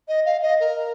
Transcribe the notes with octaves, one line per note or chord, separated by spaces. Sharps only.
D#5
F5
D#5
A#4